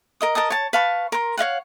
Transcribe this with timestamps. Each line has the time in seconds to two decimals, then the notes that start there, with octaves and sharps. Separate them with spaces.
0.21 A#4 D#5 D#6
0.35 A#4 D#5 A5 D#6
0.50 C#5 A5
0.73 B4 F5 A5 C#6
1.12 A#4 C6
1.37 C#5 D#5 F5 F#5